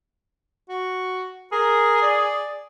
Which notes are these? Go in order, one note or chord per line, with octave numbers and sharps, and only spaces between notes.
F#4
G#4 A#4
D5